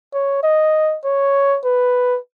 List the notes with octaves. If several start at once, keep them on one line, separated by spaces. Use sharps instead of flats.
C#5
D#5
C#5
B4